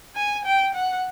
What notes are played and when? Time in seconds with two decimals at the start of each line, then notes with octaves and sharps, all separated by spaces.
0.16 G#5
0.45 G5
0.74 F#5